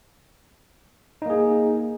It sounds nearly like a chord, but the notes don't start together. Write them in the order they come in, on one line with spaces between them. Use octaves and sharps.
D#4 A#3 G#4